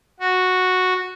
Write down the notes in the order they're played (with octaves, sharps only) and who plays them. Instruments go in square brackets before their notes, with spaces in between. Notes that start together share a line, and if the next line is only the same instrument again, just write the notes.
[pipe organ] F#4